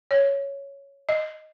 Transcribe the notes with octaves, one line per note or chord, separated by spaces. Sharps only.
C#5
D#5